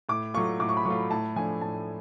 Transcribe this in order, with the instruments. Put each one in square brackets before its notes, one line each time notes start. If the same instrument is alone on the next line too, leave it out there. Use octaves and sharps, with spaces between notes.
[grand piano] A2 [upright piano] D6
[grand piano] F#3 A3 F4 [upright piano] C#6
[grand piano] A2 [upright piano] D6
[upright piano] C#6
B5
[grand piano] F#3 A3 F4 [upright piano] C#6
[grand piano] A2 [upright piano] A5
[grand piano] F3 A3 D4 [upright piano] G#5
[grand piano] A2 [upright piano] A5